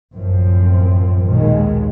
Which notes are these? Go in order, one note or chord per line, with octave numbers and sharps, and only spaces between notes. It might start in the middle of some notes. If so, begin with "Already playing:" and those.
A1 F#2 F3 C4
A#1 D#2 B2 D#3 G#3